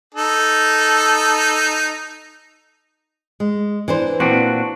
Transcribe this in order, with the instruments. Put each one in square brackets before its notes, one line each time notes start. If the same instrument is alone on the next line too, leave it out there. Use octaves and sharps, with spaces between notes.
[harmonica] D#4 A4
[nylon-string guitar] G#3
E3 D4 C5
[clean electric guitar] A#2 D4 F#4 [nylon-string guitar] C4